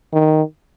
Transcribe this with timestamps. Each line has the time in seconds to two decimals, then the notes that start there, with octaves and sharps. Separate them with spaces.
0.13 D#3